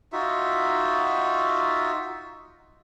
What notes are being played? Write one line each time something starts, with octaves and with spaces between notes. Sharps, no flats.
D#4 F4 F#4 E5